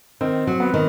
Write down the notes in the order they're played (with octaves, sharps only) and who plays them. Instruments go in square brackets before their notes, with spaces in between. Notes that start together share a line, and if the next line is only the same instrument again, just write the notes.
[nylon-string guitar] D#3 [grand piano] C4
[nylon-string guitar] F#3
[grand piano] B3
[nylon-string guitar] D#3